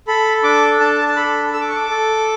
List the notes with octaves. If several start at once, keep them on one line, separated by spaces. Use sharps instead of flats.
A4 B5
D4 D6
D4 A5
A5
A4 B5
A4 E6
D6
C#6
D6
A4